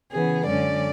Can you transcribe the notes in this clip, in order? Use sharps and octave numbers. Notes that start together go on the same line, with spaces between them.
C#3 E3 B3 G#4
F#2 D3 G#3 C#4 D5